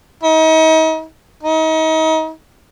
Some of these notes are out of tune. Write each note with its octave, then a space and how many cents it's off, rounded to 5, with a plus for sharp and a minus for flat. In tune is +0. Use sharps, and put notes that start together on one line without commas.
D#4 +40
D#4 +35